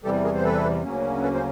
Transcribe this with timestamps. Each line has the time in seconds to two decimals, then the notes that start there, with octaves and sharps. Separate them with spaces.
0.04 E2 C3 E3 G3 G4 A4
0.24 G#4 A#4
0.34 C5
0.44 A4 B4
0.83 D2 C#3 F#3 A#3 C#4
1.22 A4 B4
1.34 C5